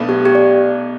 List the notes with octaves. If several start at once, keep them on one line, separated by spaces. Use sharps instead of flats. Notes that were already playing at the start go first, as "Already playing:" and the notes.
Already playing: B1 B2 A3 D4 B4
G4
G4
D5